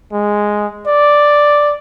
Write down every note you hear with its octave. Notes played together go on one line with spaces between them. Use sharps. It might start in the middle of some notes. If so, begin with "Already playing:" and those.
G#3
D5